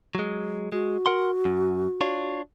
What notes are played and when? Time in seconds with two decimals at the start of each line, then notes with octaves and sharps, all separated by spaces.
0.15 F#3 G#3
0.72 G#3 F#4
1.06 A#4 F#5 C6
1.45 F#2
2.01 D4 F4 C#5